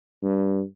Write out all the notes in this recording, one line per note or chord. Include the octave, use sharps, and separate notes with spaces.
G2